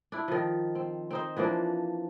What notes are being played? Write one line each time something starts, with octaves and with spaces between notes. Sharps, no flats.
D4 E4
D#3 F3
C4
C4 D#4 C5
E3 F3 A#3 D4